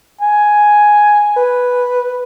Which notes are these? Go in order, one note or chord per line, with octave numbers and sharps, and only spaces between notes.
G#5
B4